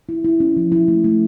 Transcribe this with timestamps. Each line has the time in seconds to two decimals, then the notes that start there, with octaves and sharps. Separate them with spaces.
0.09 E4
0.24 E4
0.40 C#4
0.57 F3
0.72 E4
0.88 A3
1.04 A3